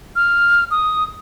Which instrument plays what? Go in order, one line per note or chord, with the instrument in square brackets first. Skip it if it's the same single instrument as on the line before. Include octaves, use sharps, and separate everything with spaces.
[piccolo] F6
D#6